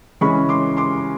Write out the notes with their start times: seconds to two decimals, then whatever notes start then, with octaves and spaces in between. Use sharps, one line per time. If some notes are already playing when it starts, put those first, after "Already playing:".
0.21 C#3 E3 G#3 C#4 B5 C#6
0.49 C6 D6
0.77 C6 D6